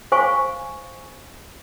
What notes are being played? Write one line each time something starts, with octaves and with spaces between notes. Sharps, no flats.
C5 F5 G#5 C#6